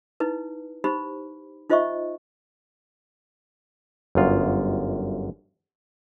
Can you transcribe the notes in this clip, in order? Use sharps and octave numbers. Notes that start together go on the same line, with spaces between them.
D#4 E4 B4
D#4 G4 C5 B5
D#4 F4 C5 D#5 E5 C#6
G1 F#2 F4